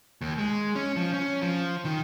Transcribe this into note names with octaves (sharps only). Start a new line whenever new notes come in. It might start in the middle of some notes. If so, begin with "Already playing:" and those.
D#2
G#3
C#4
F3
C#4
F3
D#3